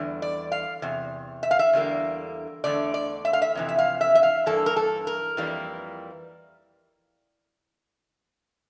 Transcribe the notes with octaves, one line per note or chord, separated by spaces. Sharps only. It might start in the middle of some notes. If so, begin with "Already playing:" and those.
Already playing: E2 D3 G3
D5
F5
E2 C3
E5
F5
E5
E2 D3 G3 A#3
E2 D3 A3 D5
D5
E5
F5
E5
F2 C3 E3
E5
F5
E5
E5
F5
G2 E3 A#3 A4
A#4
A4
A#4
F2 E3 G3 A#3